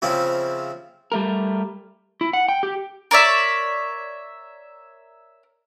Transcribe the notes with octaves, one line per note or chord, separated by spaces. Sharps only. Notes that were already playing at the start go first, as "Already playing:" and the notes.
C#3 F3 C4 C#4 E4
G3 A3 A#4
E4
F#5
G5
G4
A#4 C#5 D5 E5